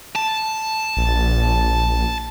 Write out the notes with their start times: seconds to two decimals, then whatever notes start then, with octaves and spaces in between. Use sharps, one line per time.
0.15 A5
0.97 A#1